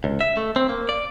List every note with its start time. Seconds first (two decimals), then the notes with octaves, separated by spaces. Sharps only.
0.04 C#2
0.21 E5
0.37 A3
0.56 C4
0.69 A#3
0.89 D5